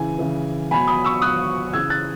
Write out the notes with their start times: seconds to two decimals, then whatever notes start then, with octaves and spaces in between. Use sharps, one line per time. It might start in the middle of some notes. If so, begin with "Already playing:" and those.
Already playing: C#3 E3 G#5
0.19 C#3 E3
0.71 B2 F#3 G#5 B5
0.87 B5 D#6
1.05 C#6 E6
1.22 B2 F#3 D#6 F#6
1.73 C#3 E3 E6 G#6
1.90 F#6 A6